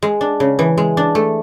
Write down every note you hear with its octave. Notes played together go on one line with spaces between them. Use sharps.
G#3
D4
C#3
E3
G#3
D4
A3